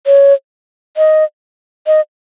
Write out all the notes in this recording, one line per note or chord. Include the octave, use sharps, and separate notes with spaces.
C#5
D#5
D#5